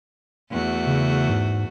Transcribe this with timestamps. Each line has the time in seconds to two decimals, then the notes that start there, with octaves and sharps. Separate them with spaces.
0.51 E2 A3 F#4
0.87 C#3
1.29 G#2